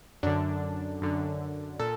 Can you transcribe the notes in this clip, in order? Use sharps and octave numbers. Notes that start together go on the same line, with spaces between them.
F#2 D3 D4
F#2 D3
A#2 A4